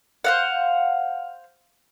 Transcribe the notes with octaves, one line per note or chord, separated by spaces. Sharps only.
C5 F5 F#5